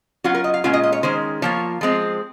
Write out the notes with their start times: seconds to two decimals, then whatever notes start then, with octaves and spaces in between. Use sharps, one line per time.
0.24 F#3 C#4 F4 F#4
0.35 A#4
0.44 D#5
0.54 F5
0.64 A#2 G#3 C#4 F4 F#5
0.73 D#5
0.83 D#5
0.93 C#5
1.03 D#3 G#3 C#4 C5
1.42 F3 A#3 F4 C#5
1.81 F3 G#3 C4